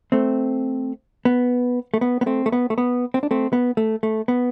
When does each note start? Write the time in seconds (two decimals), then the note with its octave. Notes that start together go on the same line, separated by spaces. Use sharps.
0.12 A3 C4
1.25 B3
1.94 A3
2.01 B3
2.21 B3
2.26 A3 C4
2.46 A3
2.52 B3
2.70 A3
2.78 B3
3.14 C4
3.23 D4
3.31 A3 C4
3.53 B3
3.77 A3
4.03 A3
4.28 B3